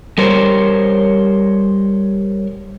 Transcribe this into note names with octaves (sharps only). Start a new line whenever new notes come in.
G3 A#4 C5 C#5